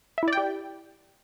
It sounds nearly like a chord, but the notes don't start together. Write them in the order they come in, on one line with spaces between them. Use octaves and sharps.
E5 E4 D5 G5 G4